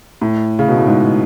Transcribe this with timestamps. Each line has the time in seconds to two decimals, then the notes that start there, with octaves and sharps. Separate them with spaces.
0.21 A2
0.59 C#3
0.68 B2
0.77 A2
0.87 G#2